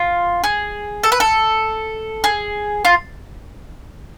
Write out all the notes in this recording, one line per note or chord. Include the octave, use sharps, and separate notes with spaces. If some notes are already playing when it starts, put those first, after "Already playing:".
Already playing: F4
G#4
A4
B4
A4
G#4
F4